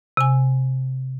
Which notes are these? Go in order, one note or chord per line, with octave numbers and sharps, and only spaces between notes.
C3 G#5